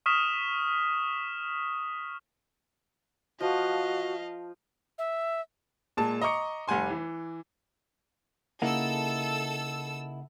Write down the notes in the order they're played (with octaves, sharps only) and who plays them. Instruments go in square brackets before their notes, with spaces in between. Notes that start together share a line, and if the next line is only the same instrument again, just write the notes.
[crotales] C#6 D#6 F6 B6 E7
[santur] F3 [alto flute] F#4 [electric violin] D#5 F5
[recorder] E5
[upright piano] A#2 G#3 A5
D#5 A#5 C#6 D6 C#7
F1 G3 F#5 G#5 C6
E3
[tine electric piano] C#3 F#5 [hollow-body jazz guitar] A#3 D#4 E4 [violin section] A4 E6